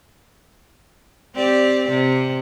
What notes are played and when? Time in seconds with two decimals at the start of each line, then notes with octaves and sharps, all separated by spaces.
1.35 C4 G4 D5
1.90 C3